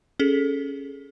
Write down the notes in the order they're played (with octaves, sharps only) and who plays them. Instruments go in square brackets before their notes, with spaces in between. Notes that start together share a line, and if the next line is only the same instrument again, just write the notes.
[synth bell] C#4 G#4 A4